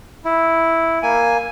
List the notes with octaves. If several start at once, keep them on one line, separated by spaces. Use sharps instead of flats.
E4
A#3 G#5